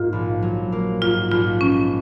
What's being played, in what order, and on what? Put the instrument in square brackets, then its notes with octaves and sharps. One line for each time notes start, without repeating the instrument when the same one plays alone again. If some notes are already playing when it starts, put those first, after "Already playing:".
Already playing: [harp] G#2 A#3 [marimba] F4
[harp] A#1
F#3
A#3
[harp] G#2 [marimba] F4
[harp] A#1 [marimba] F4
[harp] G#3 [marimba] C#4